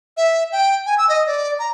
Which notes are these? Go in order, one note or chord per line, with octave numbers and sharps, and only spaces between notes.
E5
G5
G#5
E6
D#5
D5
A#5